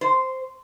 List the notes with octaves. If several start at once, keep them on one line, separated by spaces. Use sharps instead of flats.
C5